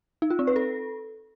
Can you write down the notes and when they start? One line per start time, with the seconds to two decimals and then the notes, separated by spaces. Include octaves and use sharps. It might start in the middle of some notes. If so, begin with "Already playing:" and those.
0.22 D#4
0.30 F4
0.39 C4
0.47 B4
0.56 A4